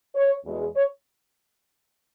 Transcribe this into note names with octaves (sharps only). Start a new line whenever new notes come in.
C#5
E2 B2 G#3
C#5